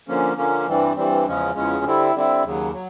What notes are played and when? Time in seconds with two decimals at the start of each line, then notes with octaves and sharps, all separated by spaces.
0.08 D3 F3 A#3 C#4
0.37 D3 F3 A#3 C#4
0.67 G2 E3 G3 C4
0.96 G2 E3 G3 C4
1.26 E2 C#3 F3 G#3 C#4
1.55 E2 C#3 F3 G#3 C#4
1.85 D3 G3 C4 E4
2.14 D3 G3 C4 E4
2.43 D#2 C#3 F#3
2.73 F#3